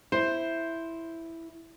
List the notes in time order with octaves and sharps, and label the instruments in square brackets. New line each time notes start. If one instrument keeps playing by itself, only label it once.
[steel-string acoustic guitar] E4 [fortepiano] C5